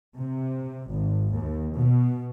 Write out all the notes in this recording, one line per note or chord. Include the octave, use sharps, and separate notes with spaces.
C3
G#1
D#2
B2